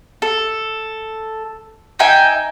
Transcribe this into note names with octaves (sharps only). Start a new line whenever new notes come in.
A4
D#4 E5 G5 G#5